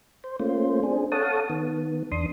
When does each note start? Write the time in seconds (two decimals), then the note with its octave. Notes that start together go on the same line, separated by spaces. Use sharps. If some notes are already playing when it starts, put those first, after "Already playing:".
0.24 C5
0.40 A3 A#3 C#4 F4 C5
0.83 C4 D4 G#4
1.12 A4 C#5 F5 F#5 A5 D#6
1.50 D#3 B3
2.11 E2 D4 C6 D#6